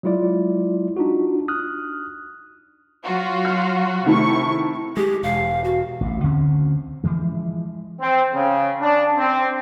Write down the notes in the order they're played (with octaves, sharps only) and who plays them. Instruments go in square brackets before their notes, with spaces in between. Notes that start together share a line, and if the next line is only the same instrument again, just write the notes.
[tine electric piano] F#3 G#3 E4 F4 D5
D4 D#4 F4 F#4
D#6 F6 F#6
[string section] F#3 F4 F#4
[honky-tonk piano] F6
[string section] C3 C#6 [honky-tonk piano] D#3 A3 E4
[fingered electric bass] G#3 [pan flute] G4
[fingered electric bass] E1 [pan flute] F5
[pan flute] F#4
[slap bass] A1 A2
D2 D3 C4 C#4
E3 F3 G#3
[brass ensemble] C4
C#3
D4
C4